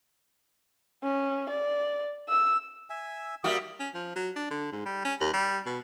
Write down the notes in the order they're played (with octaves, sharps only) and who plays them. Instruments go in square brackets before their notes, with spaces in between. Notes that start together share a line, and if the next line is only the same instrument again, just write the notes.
[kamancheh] C#4
D5
E6
[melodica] E5 G#5 E6
[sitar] G3 A#3 F#4 [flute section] E5 D#6
[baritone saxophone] C#4
F3
F#3
D4
D3
G#2
G3
C#4
D#2
G3
B2